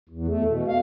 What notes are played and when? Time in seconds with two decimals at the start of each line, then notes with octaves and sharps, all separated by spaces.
0.09 E2
0.28 A3
0.48 B2
0.68 F5